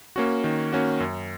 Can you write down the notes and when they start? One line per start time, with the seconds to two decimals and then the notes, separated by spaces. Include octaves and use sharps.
0.16 A#3 C#4 F#4
0.44 D#3
0.73 A#3 C#4 F#4
1.00 F#2